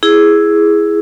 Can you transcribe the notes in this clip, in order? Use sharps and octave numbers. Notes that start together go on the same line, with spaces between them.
E4 G#4